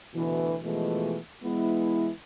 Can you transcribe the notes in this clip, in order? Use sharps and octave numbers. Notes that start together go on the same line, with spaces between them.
D2 B2 E3
B2 E3 F3 G#3 A3
E3 G#3 B3 E4